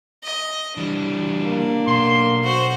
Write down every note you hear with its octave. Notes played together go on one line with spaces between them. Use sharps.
D#5
E3 G3 D4
A#3
B1 C6
F#4 C5